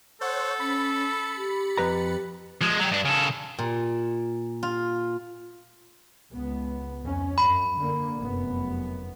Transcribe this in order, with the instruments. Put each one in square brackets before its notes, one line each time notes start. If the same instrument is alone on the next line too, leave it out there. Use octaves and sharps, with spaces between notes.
[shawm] A4 [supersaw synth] C5 C#5 F#5
[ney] C#4 [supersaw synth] B5 A6 C#7
[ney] G4
[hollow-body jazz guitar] F2 B4 A#5
[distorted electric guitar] F3 G#3
F#3 G4
G2 D4
C#3 A4
[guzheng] A#2
F4
[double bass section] C#2 B3
F2 C#4
[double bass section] F#2 [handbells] B5
[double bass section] D3 A#3
F1 F#2 B3